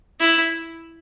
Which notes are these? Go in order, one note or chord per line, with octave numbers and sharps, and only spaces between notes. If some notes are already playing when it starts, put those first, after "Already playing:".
E4